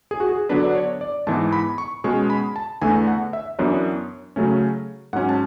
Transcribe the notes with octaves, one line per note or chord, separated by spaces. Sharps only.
G#4
F#4
G#4
D3 F#3 B3 D4 B4
D5
C#5
D5
G#2 E3 B3 A5
B5
C#6
B2 G#3 C#4 C#6
B5
A5
E2 D3 A3 G#5
F#5
E5
F#2 E3 B3 D4 C#5
C#3 F#3 A3 C#4
G#2 F#3 C#4 F#5
A5